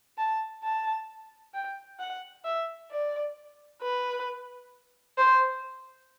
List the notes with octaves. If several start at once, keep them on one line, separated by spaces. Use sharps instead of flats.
A5
A5
G5
F#5
E5
D5
B4
C5